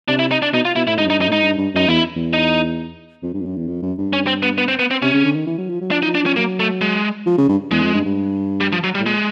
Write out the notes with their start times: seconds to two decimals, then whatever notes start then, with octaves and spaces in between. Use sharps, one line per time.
0.08 C3 D4
0.19 E4
0.31 D#4
0.42 D4
0.53 B2 D#4
0.65 F4
0.76 B2 E4
0.87 A2 E4
0.98 G#2 D#4
1.05 F#2
1.10 G2 D#4
1.20 F#2 D#4
1.28 A2
1.32 G#2 D#4
1.43 G2
1.58 G2
1.74 F#2 D#4
1.87 E2 E4
2.16 E2
2.33 D#4
3.23 F2
3.34 G2
3.40 F2
3.45 F#2
3.56 E2
3.67 F2
3.82 F#2
3.98 G2
4.13 C#4
4.27 C4
4.43 B3
4.58 B3
4.68 C4
4.79 B3
4.91 C4
5.02 C3 C#4
5.14 C#3
5.24 D3
5.35 D#3
5.46 E3
5.58 F#3
5.69 F3
5.81 F#3
5.91 F3 D4
6.02 D#4
6.07 F3
6.15 D4
6.22 F3 C#4
6.36 F#3 A#3
6.60 A3
6.81 G#3
7.26 F3
7.38 C#3
7.48 G2
7.71 E2 G#3
7.82 F2
7.94 G2
8.05 G2
8.61 G3
8.72 F3
8.84 F#3
8.95 G3
9.00 A2
9.06 A#2 G#3